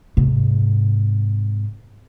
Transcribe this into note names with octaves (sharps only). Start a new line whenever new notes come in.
G#2 C3